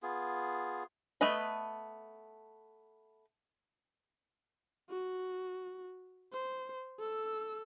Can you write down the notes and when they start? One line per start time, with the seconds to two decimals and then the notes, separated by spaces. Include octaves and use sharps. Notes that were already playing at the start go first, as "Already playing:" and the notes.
0.03 B3 F4 G#4
1.21 A3 B3 B4 D#5 B5
4.89 F#4
6.32 C5
6.99 A4 E6